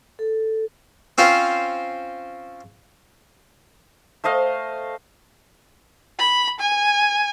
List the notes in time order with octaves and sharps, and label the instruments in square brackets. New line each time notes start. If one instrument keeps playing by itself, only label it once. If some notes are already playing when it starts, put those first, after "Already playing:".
[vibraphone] A4
[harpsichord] C4 C#4 F4 C5
[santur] A3 C5 D#5 F5
[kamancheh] B5
G#5